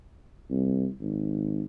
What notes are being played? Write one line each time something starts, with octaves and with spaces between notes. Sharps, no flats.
C2
G#1